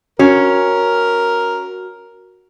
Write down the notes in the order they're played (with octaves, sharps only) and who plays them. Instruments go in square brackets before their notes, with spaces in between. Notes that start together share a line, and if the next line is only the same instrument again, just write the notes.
[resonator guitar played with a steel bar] C#4 [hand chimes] F#4 [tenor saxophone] A#4